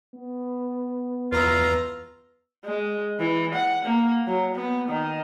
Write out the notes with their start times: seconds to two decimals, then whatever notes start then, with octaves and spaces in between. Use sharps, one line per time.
0.14 B3
1.32 E2 F4 B4 A#5 E6
2.65 G#3
3.19 E3
3.54 F#5
3.85 A#3
4.27 F#3
4.55 B3
4.88 D#3